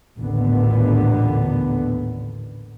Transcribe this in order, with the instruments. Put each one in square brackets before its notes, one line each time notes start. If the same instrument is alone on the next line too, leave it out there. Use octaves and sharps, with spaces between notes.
[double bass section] A1 D#2 A#2 D3 B3